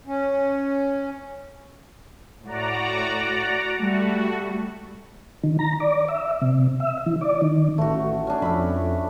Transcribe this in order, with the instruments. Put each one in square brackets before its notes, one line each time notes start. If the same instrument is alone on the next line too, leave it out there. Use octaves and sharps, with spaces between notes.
[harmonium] C#4
[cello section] A2 [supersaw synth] F#4 D5 A#5
[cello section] G3 A3 [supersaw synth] F#4
[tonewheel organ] D#3
A#5
D5
E5
C3
E5
E3
D5
D#3
[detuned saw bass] A1 [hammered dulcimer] A3 F#4
[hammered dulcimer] C#4 D4
[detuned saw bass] F2 [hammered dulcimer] E5 B5